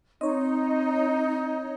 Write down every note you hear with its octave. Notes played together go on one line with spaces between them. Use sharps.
C4 D#4 C#5 D#5